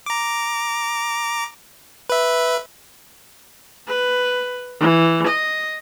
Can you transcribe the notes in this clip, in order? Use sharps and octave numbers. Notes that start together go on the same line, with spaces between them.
A#5 D6
B4 E5
B4
E3
D#5